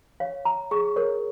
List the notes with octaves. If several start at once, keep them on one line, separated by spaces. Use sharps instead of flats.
C#5 F5
A#5
G#4 C#6
A#4 C#5